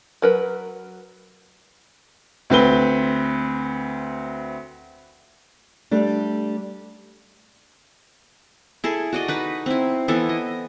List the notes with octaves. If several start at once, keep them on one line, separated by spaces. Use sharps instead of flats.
F#3 A#4 B4
D2 C4 B4 G7
G3 A3 D4
E4 G#4 A4
F#4 D5 D#5
D#4 B4
C4 E4
E3 B3 E4 A4
D#5